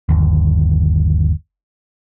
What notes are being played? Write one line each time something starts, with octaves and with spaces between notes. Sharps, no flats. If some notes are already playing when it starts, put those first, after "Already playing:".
G1 D#2